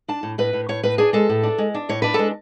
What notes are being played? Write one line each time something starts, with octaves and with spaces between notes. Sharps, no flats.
D4 A5
A2
A2 B4
A2
A2 C#5
A2 B4
D4 G#4
G#3 A4
A2
D4
G#3
D4
A2 C#5
D4 B4
G#3 A4